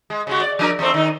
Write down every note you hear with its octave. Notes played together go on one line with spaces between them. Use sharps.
G#3
C#3 G#3 F#4
D5
F3 D4 A#4
E2 A3 C4
D#3 D#4